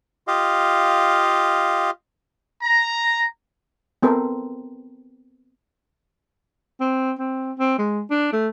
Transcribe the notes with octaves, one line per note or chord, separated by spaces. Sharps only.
F4 G4 D#5 F5
A#5
B3 C4 A4 A#4 C5
C4
C4
C4
G#3
D4
A3